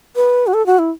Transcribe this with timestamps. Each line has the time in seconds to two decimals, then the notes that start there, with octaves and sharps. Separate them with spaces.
0.16 B4
0.47 F#4
0.54 A4
0.66 F#4
0.79 E4